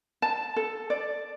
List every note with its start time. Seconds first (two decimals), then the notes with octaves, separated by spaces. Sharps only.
0.22 A5
0.56 A4
0.90 D5